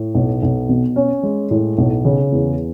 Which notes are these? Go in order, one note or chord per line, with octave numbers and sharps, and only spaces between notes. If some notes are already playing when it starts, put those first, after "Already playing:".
Already playing: A2
B1
B1
B2
C#4
G#3
A2
B1
C#3
E2